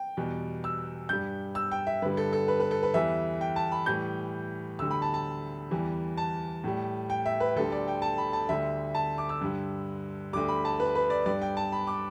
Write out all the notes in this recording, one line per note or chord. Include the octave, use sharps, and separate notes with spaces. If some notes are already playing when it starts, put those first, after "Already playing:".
Already playing: G5
E2 B2 G3
E6
G2 G3 G6
E6
G5
E5
G2 D3 G3 B4
A4
A4
B4
B4
A4
B4
E2 E3 G3 E5
G5
A5
B5
A2 E3 G3 G6
D2 D3 G3 E6
B5
A5
A5
E2 E3 G3
A5
A2 G3
G5
E5
B4
D2 D3 G3 A4
D5
G5
A5
B5
A5
D2 D3 G3 E5
A5
D6
E6
G2 D3 G3
D2 D3 G3 D6
B5
A5
B4
B4
D5
G2 G3 D5
G5
A5
B5
D6